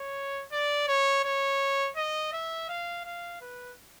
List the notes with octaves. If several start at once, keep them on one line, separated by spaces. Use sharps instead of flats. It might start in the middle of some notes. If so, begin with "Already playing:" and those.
Already playing: C#5
D5
C#5
C#5
D#5
E5
F5
F5
B4